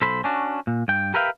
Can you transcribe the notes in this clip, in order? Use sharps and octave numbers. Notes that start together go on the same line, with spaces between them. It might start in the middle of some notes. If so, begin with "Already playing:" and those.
B1 A4 C5 B5
C#4 D4 F#4
A#2
G2 G5
G4 A#4 B4 E5 F5 G5